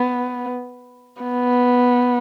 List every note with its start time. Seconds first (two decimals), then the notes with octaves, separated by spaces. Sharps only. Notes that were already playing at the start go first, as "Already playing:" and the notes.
Already playing: B3
1.22 B3